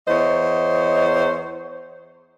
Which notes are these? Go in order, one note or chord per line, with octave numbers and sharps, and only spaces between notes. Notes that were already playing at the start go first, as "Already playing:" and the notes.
E2 C5 C#5 D#5